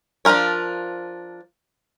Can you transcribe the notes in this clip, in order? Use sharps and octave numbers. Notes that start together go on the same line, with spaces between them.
F3 D4 F4 A#4 C#5